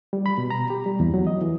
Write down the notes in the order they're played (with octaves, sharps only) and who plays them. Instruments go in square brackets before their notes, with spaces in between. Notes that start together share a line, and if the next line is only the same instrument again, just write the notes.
[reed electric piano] G3
B5
B2
A#5
G4
G3
E2
F#3
D#5
E3